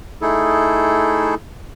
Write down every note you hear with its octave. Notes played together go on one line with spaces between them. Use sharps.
A3 D#4 E4 G#4 A4